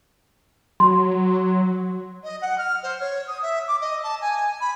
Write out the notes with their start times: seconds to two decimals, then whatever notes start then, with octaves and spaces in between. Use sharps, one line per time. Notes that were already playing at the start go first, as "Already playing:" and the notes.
0.80 F#3 C6
2.24 D#5
2.41 F#5
2.58 F6
2.83 C5
3.00 C#5
3.27 D#6
3.42 E5
3.68 D6
3.81 D#5
4.04 A5
4.21 G#5
4.61 B5